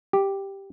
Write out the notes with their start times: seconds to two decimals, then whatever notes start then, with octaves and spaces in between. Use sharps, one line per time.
0.13 G4